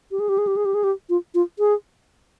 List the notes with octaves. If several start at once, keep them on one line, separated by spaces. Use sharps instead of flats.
G4
G#4
G4
G#4
G4
G#4
G4
G#4
G4
F4
F4
G#4